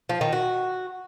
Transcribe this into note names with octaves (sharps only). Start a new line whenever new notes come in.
F3
D#3
F#4